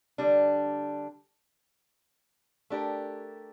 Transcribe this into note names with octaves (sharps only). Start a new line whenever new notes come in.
D3 G3 D4
A3 D4 G4 A#4